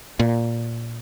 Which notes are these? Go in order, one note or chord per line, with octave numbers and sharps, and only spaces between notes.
A#2